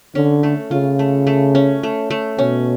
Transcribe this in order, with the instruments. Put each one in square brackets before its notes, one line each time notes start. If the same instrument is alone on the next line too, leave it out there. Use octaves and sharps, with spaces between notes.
[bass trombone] D3 [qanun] C#4
[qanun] A3
[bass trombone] C#3 [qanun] F4
[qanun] A3
A3
C#4
A3
A3
[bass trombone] B2 [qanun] C#4